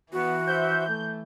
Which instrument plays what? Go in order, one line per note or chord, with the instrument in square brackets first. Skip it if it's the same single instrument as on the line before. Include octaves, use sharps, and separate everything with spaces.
[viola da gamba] E3 [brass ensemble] B3 [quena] F#4
[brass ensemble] C5 E5 [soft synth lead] G6
[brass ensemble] A3